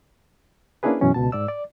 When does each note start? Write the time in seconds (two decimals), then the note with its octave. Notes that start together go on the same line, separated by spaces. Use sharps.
0.83 A#3 C#4 D4 E4 G#4 B4
1.01 F#2 B2 E3 C#4
1.14 C#2 B2 A5
1.32 G#2 D5 E6
1.48 D5